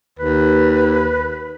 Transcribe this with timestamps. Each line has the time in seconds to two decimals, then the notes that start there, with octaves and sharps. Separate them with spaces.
0.19 D#2 B4